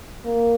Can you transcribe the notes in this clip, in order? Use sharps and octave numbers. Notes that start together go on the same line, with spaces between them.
A#3